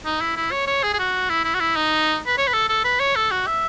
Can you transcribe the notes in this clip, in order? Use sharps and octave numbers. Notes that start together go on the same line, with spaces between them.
D#4
E4
E4
C#5
C#5
G#4
G#4
F#4
E4
E4
F#4
E4
D#4
B4
C#5
B4
A4
A4
B4
C#5
A4
F#4
E5